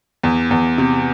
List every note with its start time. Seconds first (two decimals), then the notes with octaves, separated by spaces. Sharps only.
0.23 E2
0.51 E2
0.78 C3